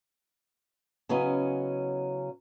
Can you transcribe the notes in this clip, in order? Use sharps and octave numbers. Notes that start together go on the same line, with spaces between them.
C#3 F#3 B3 C#4 E4 D#5